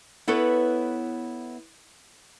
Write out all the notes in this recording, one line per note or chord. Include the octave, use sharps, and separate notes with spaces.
B3 E4 A4 B4 C#5